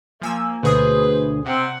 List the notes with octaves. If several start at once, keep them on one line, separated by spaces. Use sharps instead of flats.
F3 A#3 G#5 E6
D2 B2 G#4 B4 C5 D#6
C3 C4 F#5